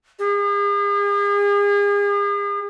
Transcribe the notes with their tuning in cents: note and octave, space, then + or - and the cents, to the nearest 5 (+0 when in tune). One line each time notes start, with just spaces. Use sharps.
G#4 -40